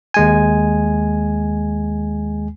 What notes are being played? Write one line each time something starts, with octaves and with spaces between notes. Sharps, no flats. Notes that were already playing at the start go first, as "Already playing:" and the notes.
D#2 G#3 G#5